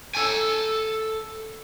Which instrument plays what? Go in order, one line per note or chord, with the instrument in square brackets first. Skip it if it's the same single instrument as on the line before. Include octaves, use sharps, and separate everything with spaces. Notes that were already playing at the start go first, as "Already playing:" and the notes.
[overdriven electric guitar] A4 G#5